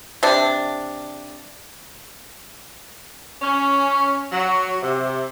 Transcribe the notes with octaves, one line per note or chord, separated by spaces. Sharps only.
C3 D4
C#4
F#3
C3